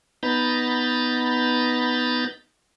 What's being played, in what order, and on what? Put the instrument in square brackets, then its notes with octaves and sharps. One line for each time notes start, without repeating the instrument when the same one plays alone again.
[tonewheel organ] B3 D#4 A#5 B5 G6 A6